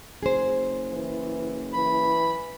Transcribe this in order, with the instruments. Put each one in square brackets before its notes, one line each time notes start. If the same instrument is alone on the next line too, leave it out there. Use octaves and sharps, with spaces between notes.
[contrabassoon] F#1 [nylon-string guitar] G#4 C5
[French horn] E3
[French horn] E3 [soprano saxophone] B5